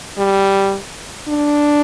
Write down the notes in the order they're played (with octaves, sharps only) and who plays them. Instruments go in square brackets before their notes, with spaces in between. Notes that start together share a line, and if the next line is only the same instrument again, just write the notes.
[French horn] G3
D4